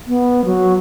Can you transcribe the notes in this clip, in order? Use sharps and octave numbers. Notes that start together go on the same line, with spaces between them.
B3
F#3